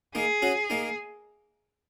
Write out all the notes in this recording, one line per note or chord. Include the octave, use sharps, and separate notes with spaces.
A#3 D#4 G#4
C#4 F#4
A#3 D#4